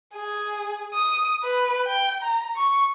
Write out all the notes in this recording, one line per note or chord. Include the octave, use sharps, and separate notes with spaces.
G#4
D#6
B4
G5
A#5
C#6